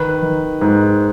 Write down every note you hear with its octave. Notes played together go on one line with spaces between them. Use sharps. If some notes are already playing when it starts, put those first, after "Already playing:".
Already playing: D#3 B4
D#3
G#2